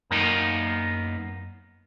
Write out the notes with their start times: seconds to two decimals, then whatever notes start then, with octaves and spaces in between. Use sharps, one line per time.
0.11 F#2 A#3 B3 D#4 A#4